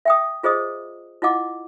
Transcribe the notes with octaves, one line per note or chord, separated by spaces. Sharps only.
E5 G5 D#6
F4 G#4 C5 D#5 D#6
E4 F4 D#5 F#5 D6